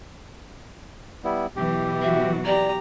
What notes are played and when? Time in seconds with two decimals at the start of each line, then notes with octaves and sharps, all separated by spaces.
1.24 G3 B3 E4
1.56 B2 E3 F#3 G4
2.02 F#4 E5
2.46 G4 D5 A#5